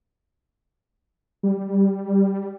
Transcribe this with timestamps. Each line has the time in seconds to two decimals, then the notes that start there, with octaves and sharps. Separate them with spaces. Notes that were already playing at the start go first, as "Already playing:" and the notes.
1.43 G3